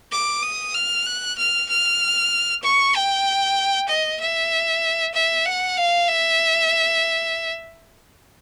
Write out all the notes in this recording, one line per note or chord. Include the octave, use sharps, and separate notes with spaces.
D6
D#6
F6
F#6
F6
F6
C#6
G5
D#5
E5
E5
F#5
F5
E5